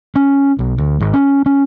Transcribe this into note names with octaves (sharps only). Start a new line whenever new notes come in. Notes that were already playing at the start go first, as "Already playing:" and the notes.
C#4
B1
D2
G#1
C#4
C#4